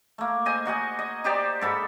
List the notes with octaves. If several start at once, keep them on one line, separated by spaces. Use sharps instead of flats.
A3 A#3
C5 D#5 G#5
D#4 F#4 D#5 G#5
D#5
D#4 G4 C5 D5
G#2 A4 B5